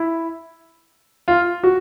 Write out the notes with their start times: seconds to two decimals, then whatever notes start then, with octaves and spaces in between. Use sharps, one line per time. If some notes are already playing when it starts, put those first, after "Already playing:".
Already playing: E4
1.28 F4
1.63 F#4